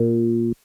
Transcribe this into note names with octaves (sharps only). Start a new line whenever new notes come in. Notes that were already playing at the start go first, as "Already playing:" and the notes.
Already playing: A#2